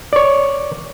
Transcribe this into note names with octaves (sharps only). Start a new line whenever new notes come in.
C#5 D5